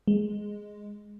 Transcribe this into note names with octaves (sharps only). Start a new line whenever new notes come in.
G#3